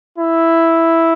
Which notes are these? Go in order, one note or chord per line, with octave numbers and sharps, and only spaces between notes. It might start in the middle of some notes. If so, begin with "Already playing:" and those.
E4